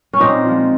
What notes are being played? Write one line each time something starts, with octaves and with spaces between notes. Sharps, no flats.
C#4
A#2 C4 D#4
F3 G#3